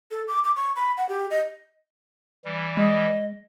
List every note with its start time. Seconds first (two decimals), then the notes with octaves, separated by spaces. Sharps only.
0.11 A4
0.28 D6
0.44 D6
0.56 C#6
0.76 B5
0.97 F#5
1.09 G4
1.31 D#5
2.45 E3 G3
2.77 G#3 D#5